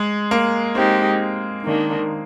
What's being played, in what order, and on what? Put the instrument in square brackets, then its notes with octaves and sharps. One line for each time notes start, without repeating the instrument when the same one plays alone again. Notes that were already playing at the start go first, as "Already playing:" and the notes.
Already playing: [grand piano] G#3
A#3
[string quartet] G#3 D#4 G4 [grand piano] C4
[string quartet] D#3 A#3 D4